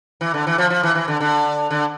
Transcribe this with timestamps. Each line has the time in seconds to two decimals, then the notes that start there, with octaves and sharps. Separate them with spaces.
0.21 E3
0.34 D3
0.47 E3
0.58 F3
0.70 F3
0.83 E3
0.95 E3
1.08 D3
1.20 D3
1.71 D3